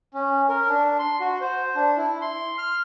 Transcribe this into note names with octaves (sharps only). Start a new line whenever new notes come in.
C#4
A#4
D4
C6
F#4
C5
D4
E4
C6
F6